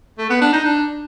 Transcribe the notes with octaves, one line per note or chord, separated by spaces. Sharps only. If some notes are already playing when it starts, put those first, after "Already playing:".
A3
B3
D4
D#4
D4